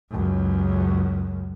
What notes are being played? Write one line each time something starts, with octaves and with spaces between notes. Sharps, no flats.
C#2 F#2